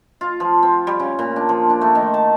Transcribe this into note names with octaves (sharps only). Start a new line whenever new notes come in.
F4
F3
C4
G3
C#3
A#2
D4
F3
D4
A3
D#3
A5